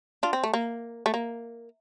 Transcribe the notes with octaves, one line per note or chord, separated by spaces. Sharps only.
D4 F4
C4
A3
A#3
A3
A#3